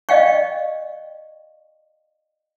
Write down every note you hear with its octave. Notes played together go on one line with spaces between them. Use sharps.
D5 D#5 F5 G5 C#6